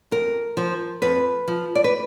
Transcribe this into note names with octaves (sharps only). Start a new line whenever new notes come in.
F2 A#4
F3
F2 B4
F3
D5
B4